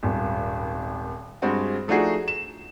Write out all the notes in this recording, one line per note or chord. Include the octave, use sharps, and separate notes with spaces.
D#1 G#1
G2 G#3 C4 F#4
F3 A3 D4 D#4 F#4 G#4
E7